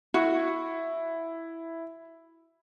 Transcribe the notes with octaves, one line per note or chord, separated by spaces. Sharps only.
E4 F#4